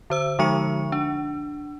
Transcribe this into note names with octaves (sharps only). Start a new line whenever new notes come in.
D3 C5 E6
D3 F3 G#3 D#4 C#6 C#7
D4